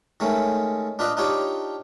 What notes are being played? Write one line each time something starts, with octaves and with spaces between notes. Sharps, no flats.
D#3 G#3 A3 C#4
D4 F4 B4 D#5
D4 D#4 F4 G4 C#5 G5